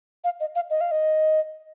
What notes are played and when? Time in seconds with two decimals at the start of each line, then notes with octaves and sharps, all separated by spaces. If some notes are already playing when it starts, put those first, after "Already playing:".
0.24 F5
0.40 D#5
0.55 F5
0.70 D#5
0.81 F5
0.91 D#5